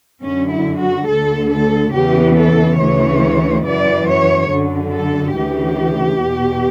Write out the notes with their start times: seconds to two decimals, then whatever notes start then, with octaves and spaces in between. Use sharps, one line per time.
0.23 F#2 D3 C#4
0.52 E4
0.80 F#4
1.08 D2 D3 A4
1.51 A4
1.93 E2 C#3 E3 G4
2.36 A4
2.78 D2 C#3 E3 C#5
3.65 F#2 E3 D5
4.07 C#5
4.49 F#2 D3
4.93 A4
5.35 D2 C#3 E3 G4
6.20 E2 B2